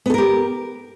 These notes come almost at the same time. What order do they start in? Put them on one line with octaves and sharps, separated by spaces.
B3 A4 A#4 G4